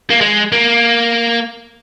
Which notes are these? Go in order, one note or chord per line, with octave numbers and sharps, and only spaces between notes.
A#3
G#3
A#3